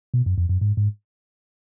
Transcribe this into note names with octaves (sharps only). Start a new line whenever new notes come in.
B2
F#2
F2
F#2
G#2
G#2